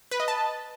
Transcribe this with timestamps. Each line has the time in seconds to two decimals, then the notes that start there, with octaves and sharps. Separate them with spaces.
0.11 B4
0.20 D#5
0.28 A5